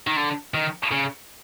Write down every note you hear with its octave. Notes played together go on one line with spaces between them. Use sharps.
D#3
D3
D#3
C#3